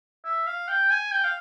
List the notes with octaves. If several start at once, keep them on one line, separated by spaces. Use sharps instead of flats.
E5
F5
G5
G#5
G5
F5